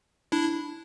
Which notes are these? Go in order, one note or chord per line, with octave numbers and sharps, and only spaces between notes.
D4 E4